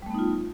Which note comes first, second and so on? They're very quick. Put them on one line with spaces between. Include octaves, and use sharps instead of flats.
G3 A3 B3 D#4 F4